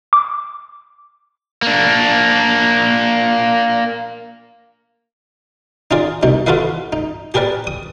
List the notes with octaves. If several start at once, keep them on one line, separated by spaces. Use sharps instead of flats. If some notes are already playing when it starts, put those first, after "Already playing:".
D6
A#3 D4
D#4 F4 G#4 D5
C2 B2 D#4
F4 F#4 A4 B4 D#5 F5
D#4
G4 G#4 A#4 B4 D5
D#6